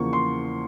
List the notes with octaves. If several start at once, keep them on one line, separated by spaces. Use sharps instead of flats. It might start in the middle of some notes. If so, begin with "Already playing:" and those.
Already playing: E2 C#3 F3 A#3 C#6
C6